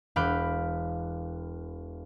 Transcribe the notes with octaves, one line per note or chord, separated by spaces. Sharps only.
E1 F5 B5 D6 F#6 G6